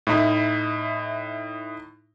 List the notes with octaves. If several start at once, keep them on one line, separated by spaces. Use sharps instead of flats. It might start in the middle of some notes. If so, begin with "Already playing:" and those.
A2 D#4 E4